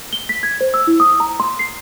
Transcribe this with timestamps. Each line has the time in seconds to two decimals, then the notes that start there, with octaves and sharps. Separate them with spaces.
0.13 G7
0.29 B6
0.43 G#6
0.61 C5
0.74 E6
0.87 E4
1.00 D#6
1.20 A#5
1.40 C6
1.59 C7